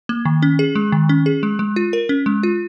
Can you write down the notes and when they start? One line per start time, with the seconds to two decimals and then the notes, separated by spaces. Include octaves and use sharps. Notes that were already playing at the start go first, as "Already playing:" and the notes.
0.09 A#3
0.25 D#3
0.42 C#4
0.59 G#4
0.75 G#3
0.92 D#3
1.09 C#4
1.26 G#4
1.43 G#3
1.59 G#3
1.76 F4
1.93 A#4
2.09 C#4
2.26 G#3
2.43 F4